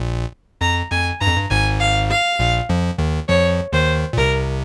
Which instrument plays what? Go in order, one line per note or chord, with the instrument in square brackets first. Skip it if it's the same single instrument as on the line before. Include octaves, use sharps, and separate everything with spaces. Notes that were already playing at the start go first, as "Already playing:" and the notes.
Already playing: [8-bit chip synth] A#1 A#2
[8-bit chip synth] F2 [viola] A#5
[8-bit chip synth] F2 [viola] G#5
[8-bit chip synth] G2 [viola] A#5
[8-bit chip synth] F2
G2
[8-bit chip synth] G#1 G#2 [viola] G#5
[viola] F5
F5
[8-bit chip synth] A#1 A#2
F2 F3
D#2 D#3
[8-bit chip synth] F2 F3 [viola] C#5
[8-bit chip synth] D#2 D#3 [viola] C5
[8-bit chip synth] A#2
[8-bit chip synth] C2 C3 [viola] A#4